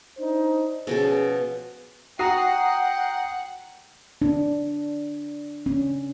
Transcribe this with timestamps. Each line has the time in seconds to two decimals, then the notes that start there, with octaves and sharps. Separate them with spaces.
0.18 D4 D#4 C5
0.87 B2 F3 C#4 G#4 A4
2.19 F#4 F#5 G5 A#5 D#6 C7
4.22 D4
5.66 C#4